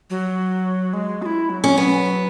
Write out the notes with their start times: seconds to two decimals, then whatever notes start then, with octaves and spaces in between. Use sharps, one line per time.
0.10 F#3
0.93 G#3
1.22 F#4
1.26 E4
1.50 F#3
1.64 C#4
1.77 F#3 B3